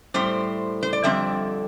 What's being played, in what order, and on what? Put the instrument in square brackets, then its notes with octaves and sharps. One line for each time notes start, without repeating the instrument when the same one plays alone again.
[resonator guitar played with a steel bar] A2 G3 C4 C5
C5
D5
F2 D3 G3 C4 E5